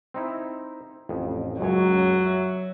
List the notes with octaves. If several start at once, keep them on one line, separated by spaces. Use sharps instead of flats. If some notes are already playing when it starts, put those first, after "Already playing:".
C4 D#4 E4
A1 F2
C#2 F#2 F#3 C#5
E5